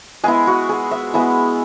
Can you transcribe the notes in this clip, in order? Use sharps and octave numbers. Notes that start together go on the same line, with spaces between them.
G#3 B3 E4 G#4
F#4
G#4
E5
G#3 B3 E4